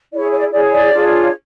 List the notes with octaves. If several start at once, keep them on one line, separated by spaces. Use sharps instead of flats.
E4 G#4 C#5 D5
C#5
D5
E4 G#4 C#5 D5
D5
D4 F4 G#4 C#5